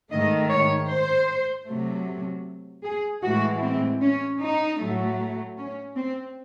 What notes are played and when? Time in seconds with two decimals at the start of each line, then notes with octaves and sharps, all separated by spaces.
0.11 G#2 D#3 A3 D#5
0.50 C#5
0.89 C5
1.67 C3 F#3 A3
2.84 G#4
3.23 A2 E3 G#3 F#4
3.62 C4
4.02 C#4
4.41 D#4
4.80 A2 F#3 A3
5.58 C#4
5.96 C4